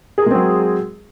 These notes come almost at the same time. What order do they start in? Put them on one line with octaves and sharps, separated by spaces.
G#4 A#4 G#3 C4 F#3